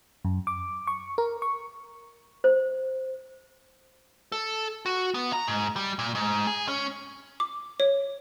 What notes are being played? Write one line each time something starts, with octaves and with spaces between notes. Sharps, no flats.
F#2
D6
C#6
A#4
C#6
C5
A4
F#4
B3
A#5
G#2
G3
A#2
G#2
G#4
C#4
D6
C#5